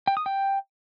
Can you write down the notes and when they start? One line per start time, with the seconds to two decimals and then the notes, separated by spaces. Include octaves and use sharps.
0.07 G5
0.17 D#6
0.26 G5